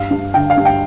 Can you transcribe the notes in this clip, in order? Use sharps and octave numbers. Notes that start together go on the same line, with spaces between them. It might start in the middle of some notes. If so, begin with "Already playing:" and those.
Already playing: G2 F5
G2
D3 G5
F5
G2
G5